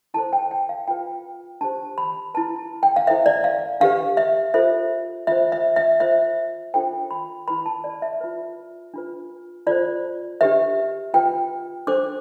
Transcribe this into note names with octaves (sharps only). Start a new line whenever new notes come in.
E4 A4 C5 A5
G5
G5
F5
F4 B4 G5
D4 G4 C5 A5
B5
E4 B4 A5
G5
F5
E4 A4 C5 E5
D5
F5
D4 G4 B4 F5
E5
F4 A4 C5 E5
F4 C5 E5
E5
E5
F4 C5 E5
D4 F4 A4 C5 G5
B5
E4 B4 B5
A5
D5
E5
F4 B4
D4 F4 B4
F4 A4 C5 D5
D4 G4 B4 E5
F4 B4 G5
D4 A4 C5 D6